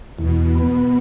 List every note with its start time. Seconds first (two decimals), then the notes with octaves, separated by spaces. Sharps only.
0.18 E2 B2
0.55 B3